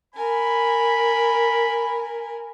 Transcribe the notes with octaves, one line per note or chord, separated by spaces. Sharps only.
A#4 G#5 B5